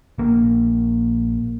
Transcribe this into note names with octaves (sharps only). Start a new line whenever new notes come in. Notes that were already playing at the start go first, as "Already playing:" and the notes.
A#1 A#3